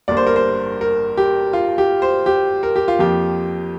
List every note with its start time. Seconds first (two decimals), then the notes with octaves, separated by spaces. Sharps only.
0.08 G1 G2 G3 A#3 D5
0.17 C5
0.27 A#4
0.36 C5
0.81 A#4
1.17 G4
1.53 F4
1.78 G4
2.02 C5
2.26 G4
2.63 A#4
2.76 G4
2.88 F4
2.99 F2 F3 A#3 G4